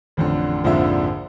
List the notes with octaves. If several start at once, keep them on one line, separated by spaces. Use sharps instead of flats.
A1 F2 D3
A#1 F2 G#2 D3 F4 E5